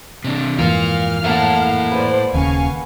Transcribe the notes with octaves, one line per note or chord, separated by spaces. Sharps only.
C3 D4
F2 G#2 E3 F4 A#4 F5 F6
A3 A#3 E4 F#5 A5
B4 C5 D5
D#1 D#2 C#3 F5 G#5 C#6